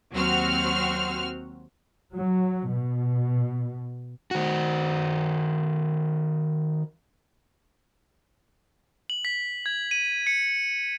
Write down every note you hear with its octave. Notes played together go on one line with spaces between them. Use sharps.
D#2 F#3 C4 F#4 F6
F#3
B2
D#3 F#4
F#7
B6
G#6
D#7
C#7